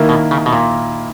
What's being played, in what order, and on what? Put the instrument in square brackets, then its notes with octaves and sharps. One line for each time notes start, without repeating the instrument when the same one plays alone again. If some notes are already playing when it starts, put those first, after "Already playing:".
Already playing: [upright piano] D#3 A#3 E4
[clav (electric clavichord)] B2
C#3
B2
A#2